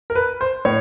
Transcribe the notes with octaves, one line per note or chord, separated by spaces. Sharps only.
A#4
B4
C5
A2 C#5